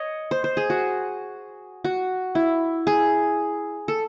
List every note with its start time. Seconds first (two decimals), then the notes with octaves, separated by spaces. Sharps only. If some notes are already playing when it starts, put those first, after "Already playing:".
Already playing: C#5 D#5
0.31 C5
0.44 C5
0.57 G#4
0.70 F#4
1.84 F#4
2.35 E4
2.87 G#4
3.88 A4